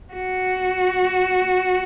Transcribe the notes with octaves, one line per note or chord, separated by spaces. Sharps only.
F#4